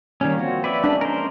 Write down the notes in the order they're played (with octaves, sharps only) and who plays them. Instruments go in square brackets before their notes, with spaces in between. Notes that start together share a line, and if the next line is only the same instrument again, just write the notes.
[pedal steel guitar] D#3 G3 C#4 [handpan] A#3 C#5
[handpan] F3 C4 [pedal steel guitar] F#4
[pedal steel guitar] B4 D5 E5
[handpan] G#3 C#4 [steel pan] D4
[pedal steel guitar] A#4 C5